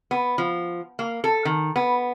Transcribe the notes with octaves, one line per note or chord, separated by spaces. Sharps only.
B3
F3
A#3
A4
D#3
B3